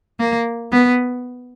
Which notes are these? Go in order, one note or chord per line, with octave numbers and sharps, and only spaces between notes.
A#3
B3